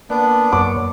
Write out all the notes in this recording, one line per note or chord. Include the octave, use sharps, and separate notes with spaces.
A#3 B3 D4 D5 F#5
F#2 A#3 C#5 D6